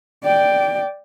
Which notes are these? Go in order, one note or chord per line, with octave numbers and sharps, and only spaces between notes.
D5 G5